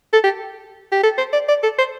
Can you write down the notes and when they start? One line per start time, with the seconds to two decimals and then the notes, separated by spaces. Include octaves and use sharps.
0.13 A4
0.24 G4
0.92 G4
1.03 A4
1.18 C5
1.33 D5
1.49 D5
1.63 A4
1.78 C5